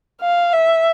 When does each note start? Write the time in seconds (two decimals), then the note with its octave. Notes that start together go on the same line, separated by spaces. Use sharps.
0.21 F5
0.53 E5